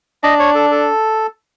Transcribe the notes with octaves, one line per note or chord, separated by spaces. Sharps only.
D4 D#5
C#5
A4
A4